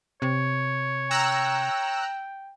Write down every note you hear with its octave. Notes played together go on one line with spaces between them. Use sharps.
C3 C#5
G5 A#5 E6 F#6